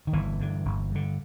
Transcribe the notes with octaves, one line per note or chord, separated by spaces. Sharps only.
D#3
G1 E3
G2 D3
G1
G2 D3